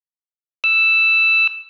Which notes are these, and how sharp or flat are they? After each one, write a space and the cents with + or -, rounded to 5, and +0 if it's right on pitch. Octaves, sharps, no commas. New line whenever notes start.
E6 +5